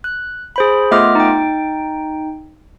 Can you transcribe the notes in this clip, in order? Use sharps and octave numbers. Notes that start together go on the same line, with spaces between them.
F#6
G#4 C5 B5
A3 B3 F4 D#5 D6 F6
D#4 G5